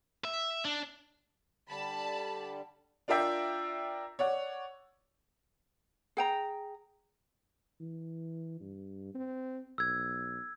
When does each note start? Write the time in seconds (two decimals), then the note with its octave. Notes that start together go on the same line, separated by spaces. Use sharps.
0.25 E5
0.65 D4
1.69 D3 G3 A5 B5
3.08 D4 F4 A#4 D5 E5 G5
4.19 C#5 D5 F#5
6.17 G#4 G5 A#5
7.80 E3
8.60 G2
9.14 C4
9.78 B1 E6 G#6